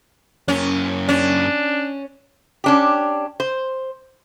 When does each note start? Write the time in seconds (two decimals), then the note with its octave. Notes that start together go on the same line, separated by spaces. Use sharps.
0.48 F#2 A#3 C#4
1.09 C#4 D4
2.64 C#4 D4 G4
3.40 C5